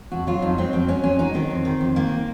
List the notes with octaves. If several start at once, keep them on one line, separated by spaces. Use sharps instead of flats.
F2 F#4
F#3 F4
F2 D#4
F#3 C4
F2 C4
F#3 C#4
F2 C#4
F#3 D#4
D#3 C4
F2
D#3
F2
D#3 A#3